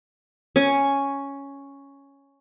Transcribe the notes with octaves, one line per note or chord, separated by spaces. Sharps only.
C#4 G#5 C#6